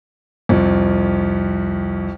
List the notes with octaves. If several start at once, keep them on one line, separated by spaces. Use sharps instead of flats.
C2 F2